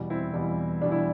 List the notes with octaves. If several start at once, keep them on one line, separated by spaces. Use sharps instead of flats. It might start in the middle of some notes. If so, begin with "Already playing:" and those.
Already playing: E2 B2 G3
C4 E4
E2 B2 G3
E2 B2 G3 D4
E4